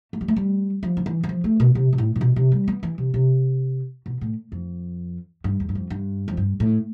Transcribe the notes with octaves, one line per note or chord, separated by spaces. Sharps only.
A3
G3
A3
G3
F3
D3
E3
E3
F3
A3
B2
C3
B2
A2
A2
B2
C3
G3
B3
E3
C3
C3
B2
A2
F2
G2
E2
G2
F2
G2
F2
G2
A2